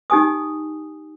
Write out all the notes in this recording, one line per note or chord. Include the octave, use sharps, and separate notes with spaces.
D#4 G4 G#5 D#6